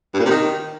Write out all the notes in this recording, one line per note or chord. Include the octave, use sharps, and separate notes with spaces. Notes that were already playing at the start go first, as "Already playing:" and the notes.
G2
A#2
C3
D#3